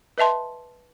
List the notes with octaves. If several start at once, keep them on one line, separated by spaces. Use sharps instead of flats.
B4 D#5 E5 A5 C6